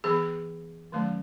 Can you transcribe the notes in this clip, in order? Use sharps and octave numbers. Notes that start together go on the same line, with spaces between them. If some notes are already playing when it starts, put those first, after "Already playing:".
E3 B3 G#4
D#3 F#3 A3 C#4